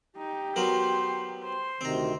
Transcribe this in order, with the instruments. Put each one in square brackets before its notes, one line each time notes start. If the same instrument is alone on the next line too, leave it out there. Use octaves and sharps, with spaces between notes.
[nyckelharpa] D#4 [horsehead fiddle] G4
[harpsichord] F#3 B3 A#4 [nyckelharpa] C5 C6
[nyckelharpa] C5 C6
[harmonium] D2 C3 D#3 [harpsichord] C4 A#5